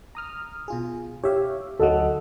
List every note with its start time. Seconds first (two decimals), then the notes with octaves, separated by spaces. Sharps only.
0.15 A#5 D#6 F6
0.68 B2 F4 G#4
1.23 G4 C#5 E5 F5
1.80 D2 F#3 A4 D#5 F#5